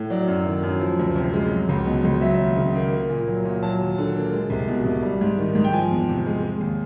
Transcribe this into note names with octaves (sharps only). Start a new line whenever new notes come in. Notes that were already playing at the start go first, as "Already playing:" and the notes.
Already playing: A2
F#3 D5
F#2
D#3
F#2
F3
D2
C3
G#3
F#3
C#2
B2
C#2
F#3 E5
D#2
C#3
A#3
A#3
A#2
F#3
A#2
F#3 A5
D#2
D3
A#3
G#3
C2
B2
C2
G3
G#2
D#3
G#2
G5
F3 G#5
E2
C3
G#3
G#3
D#2